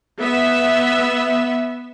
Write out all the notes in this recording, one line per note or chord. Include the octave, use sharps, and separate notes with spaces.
B3 E5